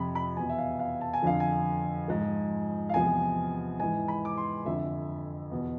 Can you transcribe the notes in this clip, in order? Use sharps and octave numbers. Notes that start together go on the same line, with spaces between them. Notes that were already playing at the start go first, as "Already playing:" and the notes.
Already playing: F2 C3 F3 B5
B5
E2 B2 G#5
E5
F5
F5
A5
G#5
F2 D3 F3 F5
G#5
G#2 F3
F5
E2 C3 F3 G#5
G#2 E3 G#5
B5
D6
C6
F2 D3 F3 E5
E2 B2